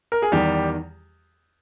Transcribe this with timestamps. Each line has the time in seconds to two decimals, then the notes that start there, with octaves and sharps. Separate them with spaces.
0.12 A#4
0.22 G#4
0.32 E2 D#3 G3 G4